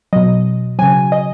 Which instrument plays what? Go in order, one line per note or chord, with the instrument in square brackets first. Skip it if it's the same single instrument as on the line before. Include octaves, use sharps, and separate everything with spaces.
[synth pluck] B2 F#3 D#5
C#3 F#3 G#5
D#5